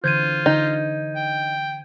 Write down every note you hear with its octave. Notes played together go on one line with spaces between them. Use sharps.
D3 E3 F4 C5 G6 G#6 D#7
D3 D#4
G5